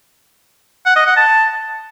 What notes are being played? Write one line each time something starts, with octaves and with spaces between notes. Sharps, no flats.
F#5
D#5
F#5
A5